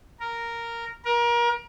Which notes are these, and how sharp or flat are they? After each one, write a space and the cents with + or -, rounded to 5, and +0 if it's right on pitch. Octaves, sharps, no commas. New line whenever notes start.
A#4 -5
A#4 +30